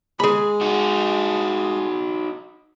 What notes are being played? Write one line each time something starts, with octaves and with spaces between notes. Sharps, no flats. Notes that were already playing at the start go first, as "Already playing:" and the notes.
G#3 G#4 B5
D#4 F#4